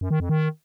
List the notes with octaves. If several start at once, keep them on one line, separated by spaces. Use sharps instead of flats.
F#2
D#3
F2
D#3